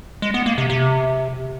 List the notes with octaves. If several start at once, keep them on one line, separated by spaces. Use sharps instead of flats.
G#3
B3
A#3
C3
C3